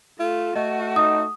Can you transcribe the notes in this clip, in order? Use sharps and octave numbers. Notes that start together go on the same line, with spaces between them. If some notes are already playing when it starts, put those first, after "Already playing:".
A3 F4
A3 F#4 D#5
D#4 D#6